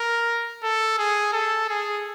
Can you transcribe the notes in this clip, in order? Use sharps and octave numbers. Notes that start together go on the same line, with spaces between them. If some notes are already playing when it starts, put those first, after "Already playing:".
Already playing: A#4
A4
G#4
A4
G#4